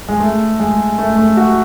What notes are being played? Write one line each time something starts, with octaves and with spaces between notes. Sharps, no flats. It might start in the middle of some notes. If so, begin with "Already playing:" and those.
G#3
A3
G#3
A3
A3
F#4